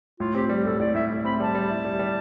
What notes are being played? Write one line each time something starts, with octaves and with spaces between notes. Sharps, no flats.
A2 F4
C4 G4
G3
A2 A4
A2 D5
A2 E5
E4
C4 B5
G3 A5
G3
E4
G3
G3